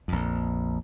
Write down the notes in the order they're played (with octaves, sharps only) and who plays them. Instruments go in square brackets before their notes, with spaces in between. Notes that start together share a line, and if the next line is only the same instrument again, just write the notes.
[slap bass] A#1 F2